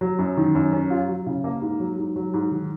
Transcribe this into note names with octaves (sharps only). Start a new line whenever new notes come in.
F#3
F#2
D#3
F#2
C#4
F4
F#3
C#3
A#3
G#2
F#3
G#2
F#3
G#2
D#3